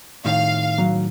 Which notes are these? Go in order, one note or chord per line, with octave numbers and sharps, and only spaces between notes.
A2 D#3 F5
F#3